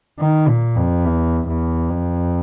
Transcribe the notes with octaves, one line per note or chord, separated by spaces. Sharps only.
D#3
A#2
F2
E2
E2
F2